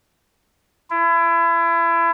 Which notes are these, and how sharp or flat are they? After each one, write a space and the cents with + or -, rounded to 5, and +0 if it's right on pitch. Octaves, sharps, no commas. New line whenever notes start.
E4 +30